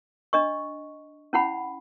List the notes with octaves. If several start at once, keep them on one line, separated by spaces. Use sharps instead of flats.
D4 D#5 C#6
C#4 E4 F#5 B5